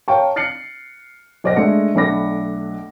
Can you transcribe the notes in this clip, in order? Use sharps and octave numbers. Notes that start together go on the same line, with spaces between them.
C#5 F5 G5 A5 A#5 C#6
F6 A6 C7 C#7 F#7
B1 C5 D5 D#5 F#5 A#6
G#3 A3 D4 A5 C#7
B1 A3 D4 B5 D6 A#6